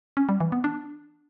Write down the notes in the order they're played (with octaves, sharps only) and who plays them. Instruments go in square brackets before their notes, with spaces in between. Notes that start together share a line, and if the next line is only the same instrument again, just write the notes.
[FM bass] C#4
G3
E3
B3
D4